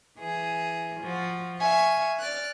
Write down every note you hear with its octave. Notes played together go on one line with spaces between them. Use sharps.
E3 G#4
F3 F#4
E5 F5 G#5 C#6
D5 F6 F#6